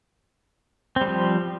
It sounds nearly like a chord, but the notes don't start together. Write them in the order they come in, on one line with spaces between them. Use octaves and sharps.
C4 G3 F3